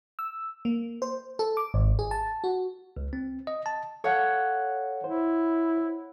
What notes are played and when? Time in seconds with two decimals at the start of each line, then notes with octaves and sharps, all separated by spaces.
0.19 E6
0.65 A#3
1.02 C5
1.39 A4
1.57 D6
1.74 G#1
1.99 G#4
2.11 A5
2.44 F#4
2.97 C#2
3.13 C4
3.47 D#5
3.66 A5
4.04 A4 C#5 F5 F#5
5.04 E4 C5